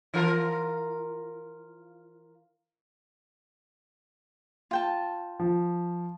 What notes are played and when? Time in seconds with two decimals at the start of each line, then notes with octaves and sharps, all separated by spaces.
0.14 E3 F4 A#4
4.71 F4 G5 A5
5.40 F3